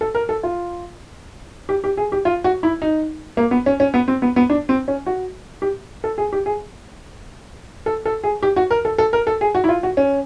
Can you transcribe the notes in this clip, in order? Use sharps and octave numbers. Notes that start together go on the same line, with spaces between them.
A4
A#4
A4
F4
G4
G4
G#4
G4
F4
F#4
E4
D#4
A#3
B3
C#4
C#4
B3
C4
B3
B3
D4
C4
C#4
F#4
G4
A4
G#4
G4
G#4
A4
A4
G#4
G4
F#4
A#4
A4
A4
A#4
A4
G#4
F#4
E4
F4
F#4
C#4